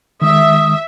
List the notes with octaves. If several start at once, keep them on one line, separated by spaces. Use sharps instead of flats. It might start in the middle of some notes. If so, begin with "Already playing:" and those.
D#3 G#3 E5 D#6